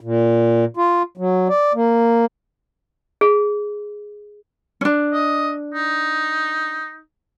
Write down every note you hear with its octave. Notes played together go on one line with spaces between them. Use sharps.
A#2
F4
F#3
D5
A#3
G#4
C#4 D4
D#5
D#4